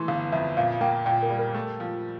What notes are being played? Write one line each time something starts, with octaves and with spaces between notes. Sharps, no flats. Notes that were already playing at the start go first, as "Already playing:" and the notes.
Already playing: E3 A3 C6
G1 F5
F2 E5
A#2 F5
A#3 G5
A#2 G5
A#4
G3
A#4
A3
F3